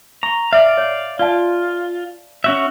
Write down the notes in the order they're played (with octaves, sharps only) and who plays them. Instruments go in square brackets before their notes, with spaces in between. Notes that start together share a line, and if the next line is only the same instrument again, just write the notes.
[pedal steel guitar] A#5 [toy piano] C#6
[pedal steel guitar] D5 F5 [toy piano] E5
[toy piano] C#5
[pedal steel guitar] F4 [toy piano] D5 F5 A5
[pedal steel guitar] C#4 F#4 E5